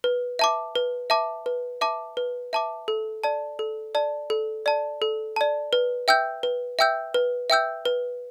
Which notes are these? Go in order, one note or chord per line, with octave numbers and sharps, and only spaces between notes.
B4
E5 A5 D6
B4
E5 A5 D6
B4
E5 A5 D6
B4
E5 A5 D6
A4
D5 A5
A4
D5 A5
A4
D5 A5
A4
D5 A5
B4
E5 G5 E6 G6
B4
E5 G5 E6 G6
B4
E5 G5 E6 G6
B4